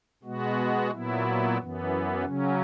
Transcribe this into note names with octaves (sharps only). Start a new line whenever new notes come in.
B2 G#3 B3 F#4
A#2 F#3 B3 E4
F#2 E3 B3
C#3 F#3 C#4